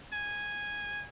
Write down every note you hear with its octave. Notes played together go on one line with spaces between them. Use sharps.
G#5